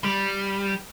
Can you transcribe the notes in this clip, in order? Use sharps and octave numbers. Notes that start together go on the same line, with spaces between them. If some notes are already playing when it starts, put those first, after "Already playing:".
G3